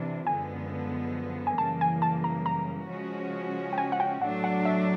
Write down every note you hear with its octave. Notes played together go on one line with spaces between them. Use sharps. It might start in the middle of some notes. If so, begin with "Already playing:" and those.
Already playing: C3 E3 D4
F#2 D3 F3 G#3 B3 G#5
G#5
F#2 C#3 E3 G3 A#3 A5
G#5
A5
A#5
A#5
C#3 F3 G#3 C#4 F#4
G5
G#5
F#5
G5
A2 F#3 A3 D4 F#5
F#5
E5